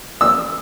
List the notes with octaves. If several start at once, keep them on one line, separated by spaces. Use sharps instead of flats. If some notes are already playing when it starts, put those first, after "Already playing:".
E6